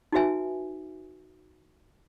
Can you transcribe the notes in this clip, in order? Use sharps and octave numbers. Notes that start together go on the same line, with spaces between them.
D#4 F#4 B4 E5 G#5